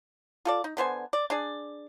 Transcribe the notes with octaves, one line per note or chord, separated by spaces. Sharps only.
F4 A4 D5
D#4
D3 B3 C5 G#5
D5
D4 G#4 D5